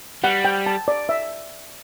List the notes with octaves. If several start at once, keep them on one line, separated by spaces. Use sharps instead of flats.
G3 F#5
G5
A5
D5
E5